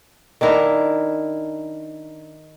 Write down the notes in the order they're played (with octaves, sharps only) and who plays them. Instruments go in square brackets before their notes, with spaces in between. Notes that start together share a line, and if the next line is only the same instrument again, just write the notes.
[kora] D#3 D4 E4 A#4